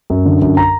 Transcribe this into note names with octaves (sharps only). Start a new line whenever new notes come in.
F#2
D3
F#2
A#5